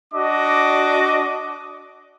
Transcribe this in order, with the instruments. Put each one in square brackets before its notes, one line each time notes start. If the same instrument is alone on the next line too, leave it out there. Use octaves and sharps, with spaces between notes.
[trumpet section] D4 F#4 D#5 D6